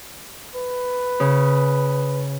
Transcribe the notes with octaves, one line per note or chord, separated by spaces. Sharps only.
B4
C#3